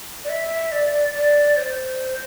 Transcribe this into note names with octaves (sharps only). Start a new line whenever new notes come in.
D5
E5
D5
D5
C5